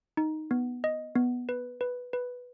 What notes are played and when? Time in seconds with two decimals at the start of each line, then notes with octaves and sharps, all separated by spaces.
0.17 D#4
0.51 B3
0.84 D#5
1.15 B3
1.49 B4
1.81 B4
2.13 B4